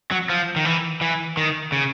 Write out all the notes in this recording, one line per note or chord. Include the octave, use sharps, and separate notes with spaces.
F#3
F3
D#3
E3
E3
D#3
C#3